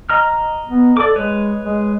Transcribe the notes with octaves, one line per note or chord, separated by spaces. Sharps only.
D#5 A#5 F6
B3
A4 D5 D6
G#3 B4 C#5
G#3